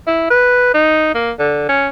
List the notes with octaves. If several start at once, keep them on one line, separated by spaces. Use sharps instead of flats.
E4
B4
D#4
A#3
D3
C#4